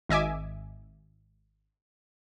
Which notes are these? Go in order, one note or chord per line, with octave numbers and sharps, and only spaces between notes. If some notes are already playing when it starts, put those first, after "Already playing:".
G#1 D#5 E5 G#5 D6